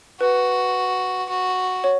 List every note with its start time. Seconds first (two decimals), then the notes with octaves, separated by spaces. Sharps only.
0.21 F#4 B4
1.30 F#4
1.84 C#5